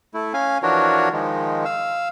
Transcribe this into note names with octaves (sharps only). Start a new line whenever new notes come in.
A3 E4
C#4 F5 G#5
E3 F3 D4 F#4 A#4 C#5
D#3 F3 G#3
F5 E6